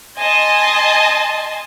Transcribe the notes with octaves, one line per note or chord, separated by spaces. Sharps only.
D#5 G#5 A5 C6